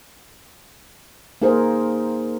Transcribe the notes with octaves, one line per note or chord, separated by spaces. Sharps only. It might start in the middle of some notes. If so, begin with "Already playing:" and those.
A#3 D#4 G#4 A#4 C5